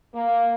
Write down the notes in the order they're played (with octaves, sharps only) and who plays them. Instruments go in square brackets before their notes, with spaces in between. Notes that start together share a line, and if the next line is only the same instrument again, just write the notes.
[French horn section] A#3